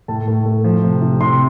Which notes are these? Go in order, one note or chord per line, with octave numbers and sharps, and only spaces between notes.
A2 A5
A2
A3
F3
C3
C3
C3 C6